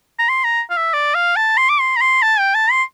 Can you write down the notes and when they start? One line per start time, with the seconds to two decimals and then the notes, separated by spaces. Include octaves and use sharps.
0.19 A#5
0.29 C6
0.44 A#5
0.70 F5
0.77 E5
0.94 D5
1.15 F5
1.36 A5
1.57 C6
1.69 D6
1.80 C6
1.96 A#5
2.01 C6
2.22 A5
2.39 G5
2.55 A5
2.71 C6